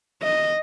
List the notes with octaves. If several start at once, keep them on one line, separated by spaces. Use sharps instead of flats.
D#5